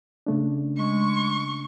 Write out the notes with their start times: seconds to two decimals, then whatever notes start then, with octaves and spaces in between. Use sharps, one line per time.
0.27 C#3 A3 D4
0.77 G#3 C#6